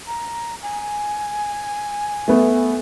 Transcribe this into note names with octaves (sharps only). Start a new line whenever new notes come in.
A#5
G#5
A3 B3